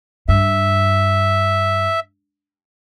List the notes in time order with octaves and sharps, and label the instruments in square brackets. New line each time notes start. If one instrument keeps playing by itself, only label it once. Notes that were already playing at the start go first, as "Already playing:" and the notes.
[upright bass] G2 [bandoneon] E5